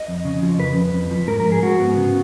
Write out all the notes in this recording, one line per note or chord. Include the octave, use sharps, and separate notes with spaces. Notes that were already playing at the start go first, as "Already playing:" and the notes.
Already playing: D#5
F2
C#3
F3
F2 B4
F2
F2
F3
G#2 A#4
A#4
G#2
G#4
G#2 F#4
B3
C#3